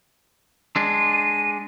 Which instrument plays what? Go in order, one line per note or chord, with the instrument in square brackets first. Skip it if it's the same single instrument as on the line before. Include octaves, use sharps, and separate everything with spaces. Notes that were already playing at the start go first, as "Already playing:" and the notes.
[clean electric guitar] G#3 D4 [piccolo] D#7